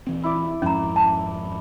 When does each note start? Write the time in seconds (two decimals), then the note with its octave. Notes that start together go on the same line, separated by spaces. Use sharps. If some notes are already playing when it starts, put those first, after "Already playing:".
0.07 D#1 E3 C4
0.24 E4 D5
0.62 F2 G#2 F3 C#4 A#5
0.96 A5